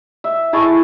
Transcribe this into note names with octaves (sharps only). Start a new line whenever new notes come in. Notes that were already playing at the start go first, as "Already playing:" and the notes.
E5
E4 G#4 A5 C#6